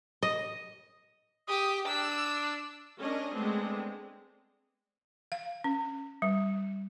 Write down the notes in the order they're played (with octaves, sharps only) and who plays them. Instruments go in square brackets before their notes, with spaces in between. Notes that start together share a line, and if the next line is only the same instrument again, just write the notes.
[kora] D#5
[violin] G4 [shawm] D#6
[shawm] D4 [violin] E6
[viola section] C#4 D4 A#4 D#5
G#3 A3 B3 C4 D4
[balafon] F5
C#4
G3